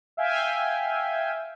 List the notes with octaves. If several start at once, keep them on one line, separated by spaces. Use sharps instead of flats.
E5 F5 G5 G#5